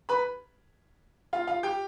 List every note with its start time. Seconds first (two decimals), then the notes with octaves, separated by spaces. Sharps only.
0.09 B4 B5
1.33 F4 F5
1.47 F4 F5
1.63 G4 G5